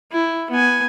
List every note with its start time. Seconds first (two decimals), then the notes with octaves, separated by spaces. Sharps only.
0.12 E4
0.51 B3 G#5